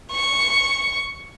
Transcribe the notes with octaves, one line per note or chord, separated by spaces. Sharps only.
C#6